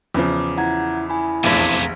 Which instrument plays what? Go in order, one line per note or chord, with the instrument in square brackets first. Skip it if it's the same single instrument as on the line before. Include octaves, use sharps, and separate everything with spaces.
[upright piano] E2 C#3 F3 [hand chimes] D6
[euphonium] E4 [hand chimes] F#5 A#5 G#6
[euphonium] E4 [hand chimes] G#5 B5
[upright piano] F1 A#1 E2 [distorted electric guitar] C3 A3 [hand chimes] F5 G#6 B6